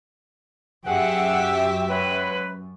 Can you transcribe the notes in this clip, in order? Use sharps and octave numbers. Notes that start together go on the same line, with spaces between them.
F#2 G4 G#4 B4 E5 F#5
F#3 G#3 B4